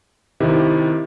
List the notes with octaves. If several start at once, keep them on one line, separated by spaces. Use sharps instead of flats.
C3 D#3 E4 G4